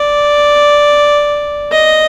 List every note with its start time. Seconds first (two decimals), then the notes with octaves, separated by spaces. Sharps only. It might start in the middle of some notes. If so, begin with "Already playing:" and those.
Already playing: D5
1.72 D#5